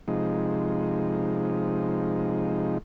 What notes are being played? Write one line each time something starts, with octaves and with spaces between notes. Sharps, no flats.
C3 F3 G#3 D#4